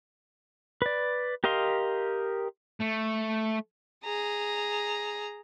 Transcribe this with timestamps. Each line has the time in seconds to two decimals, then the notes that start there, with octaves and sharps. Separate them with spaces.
0.82 B4 D5
1.44 G4 A#4 D#5 F5 C6
2.80 A3
4.05 G#4 A#5